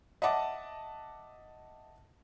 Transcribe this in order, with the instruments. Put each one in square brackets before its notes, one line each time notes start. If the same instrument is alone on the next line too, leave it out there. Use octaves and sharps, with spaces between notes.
[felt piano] D#5 E5 F#5 A5 D6